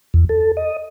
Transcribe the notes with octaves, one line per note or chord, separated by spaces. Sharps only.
E2
A4
D#5